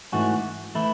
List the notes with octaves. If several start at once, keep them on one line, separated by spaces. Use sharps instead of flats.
G#2 E3 A3 C#4 F#4
E3 A3 E4